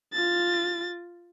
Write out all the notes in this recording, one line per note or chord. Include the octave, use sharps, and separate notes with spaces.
F4 A6